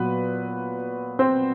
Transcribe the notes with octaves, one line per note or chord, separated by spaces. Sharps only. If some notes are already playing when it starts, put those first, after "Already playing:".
Already playing: A#2 F#3 B3 B4
C4 C5